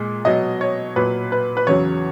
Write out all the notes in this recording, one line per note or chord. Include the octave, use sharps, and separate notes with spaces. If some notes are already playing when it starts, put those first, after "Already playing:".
Already playing: A#2 G#3
B2 F#3 D#5
C#5
A#2 F#3 B4
B4
B4
E2 C#3 F#3 C#5